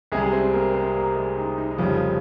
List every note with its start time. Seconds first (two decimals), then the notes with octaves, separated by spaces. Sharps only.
0.12 C2 C3 G3 G#3 G#4
0.33 C4 C5
0.53 A#3 A#4
0.74 C4 C5
0.96 A#3 A#4
1.16 G#3 G#4
1.37 D#4
1.58 D#4
1.71 D#4
1.78 F1 F2 C#3 F3 G3 F4